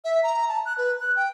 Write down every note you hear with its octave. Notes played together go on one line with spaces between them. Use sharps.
E5
A#5
A5
F#6
B4
F#6
G5